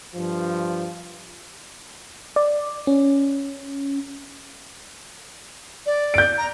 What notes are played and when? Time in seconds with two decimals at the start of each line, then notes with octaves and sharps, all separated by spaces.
0.15 G2 F3
2.36 D5
2.87 C#4
5.86 D5
6.14 G6 D7
6.38 A#5